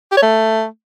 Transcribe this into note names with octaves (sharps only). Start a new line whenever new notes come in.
G4
C#5
A3